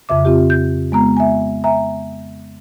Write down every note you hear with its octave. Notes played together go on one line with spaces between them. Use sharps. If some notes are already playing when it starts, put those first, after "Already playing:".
F2 C#3 E5 D6
C4 F4 G4
G6
G#3 B3 A#5
E5 G#5
E5 G#5 A#5